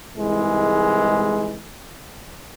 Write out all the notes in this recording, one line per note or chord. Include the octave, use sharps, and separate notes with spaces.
C2 G#2 E3 G#3